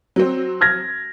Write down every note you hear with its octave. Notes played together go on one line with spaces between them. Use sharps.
F#3 C4
F6 G#6 A#6